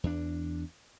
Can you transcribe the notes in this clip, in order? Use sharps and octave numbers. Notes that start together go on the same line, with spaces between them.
E2 D4